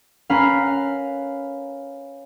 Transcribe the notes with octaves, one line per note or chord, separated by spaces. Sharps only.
C#4 A#4 B4 F5
F5